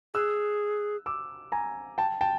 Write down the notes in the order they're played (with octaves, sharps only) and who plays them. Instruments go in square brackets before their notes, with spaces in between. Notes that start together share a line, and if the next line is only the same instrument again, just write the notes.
[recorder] G#4 [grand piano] E6 F#6
[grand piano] D6 E6
G#5 A#5
G5 A5
G5 A5